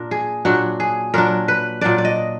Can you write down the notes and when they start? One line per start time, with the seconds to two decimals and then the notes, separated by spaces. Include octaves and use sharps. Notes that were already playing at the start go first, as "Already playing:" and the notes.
Already playing: A#2 D4 A#4
0.11 G#4
0.45 A#2 F#3 D4 F#4
0.80 G#4
1.14 A#2 F#3 D4 A#4
1.48 B4
1.81 A#2 F#3 D4 D5
1.98 D5
2.05 D#5